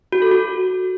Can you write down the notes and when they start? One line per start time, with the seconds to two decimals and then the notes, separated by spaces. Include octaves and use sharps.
0.12 F#4
0.22 A4
0.31 F#4